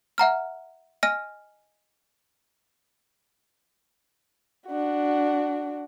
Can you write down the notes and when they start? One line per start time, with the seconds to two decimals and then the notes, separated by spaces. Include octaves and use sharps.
0.18 E5 F#5 A#5 F6
1.03 D#5 G#5 F6 A#6 D#7
4.68 D4 F#4